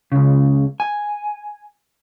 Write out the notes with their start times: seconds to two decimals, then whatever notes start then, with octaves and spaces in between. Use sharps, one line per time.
0.12 C#2 C#3
0.80 G#5